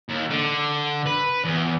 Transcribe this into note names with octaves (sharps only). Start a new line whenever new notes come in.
D#2
D3
B4
E2